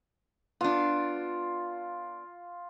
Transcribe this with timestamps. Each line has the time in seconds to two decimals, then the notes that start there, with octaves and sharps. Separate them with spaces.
0.61 B3 D4 F4